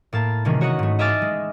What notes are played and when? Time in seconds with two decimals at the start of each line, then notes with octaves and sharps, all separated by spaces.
0.13 A2 A#3 A5
0.45 C3 D#3 E3 G#3 A#3 C#4
0.61 F#4 C#5 D#5 F#5
0.79 G#2 A3
0.99 D#5 E5 G#5 D6 F6 A6
1.22 G#3